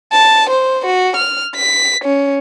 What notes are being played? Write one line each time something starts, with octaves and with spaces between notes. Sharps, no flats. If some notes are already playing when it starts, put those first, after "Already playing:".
A5
C5
F#4
F6
B6
C#4